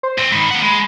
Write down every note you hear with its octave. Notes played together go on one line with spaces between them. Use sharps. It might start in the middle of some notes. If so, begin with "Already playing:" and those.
C5
A#2 C4
G#2 D#3 B5
A#3 F#5
G#3